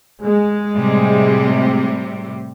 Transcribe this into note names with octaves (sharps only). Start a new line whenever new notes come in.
G#3
A2 C3 G3